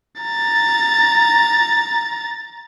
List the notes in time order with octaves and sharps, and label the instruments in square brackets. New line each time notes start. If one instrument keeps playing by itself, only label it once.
[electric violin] A#5 A6